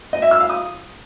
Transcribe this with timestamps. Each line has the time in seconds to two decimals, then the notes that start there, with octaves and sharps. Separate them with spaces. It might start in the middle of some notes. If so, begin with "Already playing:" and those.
0.13 D#5
0.22 E5
0.31 E6
0.40 F5
0.50 D#6